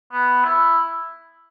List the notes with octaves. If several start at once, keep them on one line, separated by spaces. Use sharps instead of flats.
B3
E4